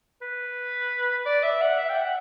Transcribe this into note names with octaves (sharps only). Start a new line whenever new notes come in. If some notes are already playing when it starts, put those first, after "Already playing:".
B4
D5
E5
F#5
E5
G5
F#5